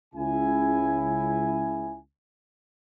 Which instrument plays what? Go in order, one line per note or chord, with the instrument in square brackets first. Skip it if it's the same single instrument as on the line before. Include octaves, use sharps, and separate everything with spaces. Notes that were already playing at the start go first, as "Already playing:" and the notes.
[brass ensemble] C#2 C#3 E4 G#5